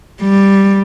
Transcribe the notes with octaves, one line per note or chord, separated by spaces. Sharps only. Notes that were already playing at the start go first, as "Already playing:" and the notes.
G3